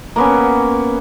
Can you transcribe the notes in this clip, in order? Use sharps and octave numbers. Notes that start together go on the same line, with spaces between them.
A#3 B3 C#4